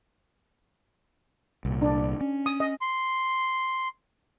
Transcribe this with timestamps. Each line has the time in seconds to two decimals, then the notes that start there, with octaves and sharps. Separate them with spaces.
1.65 C2 A#2
1.82 D4
2.21 C#4
2.46 D#6
2.60 D#5
2.81 C6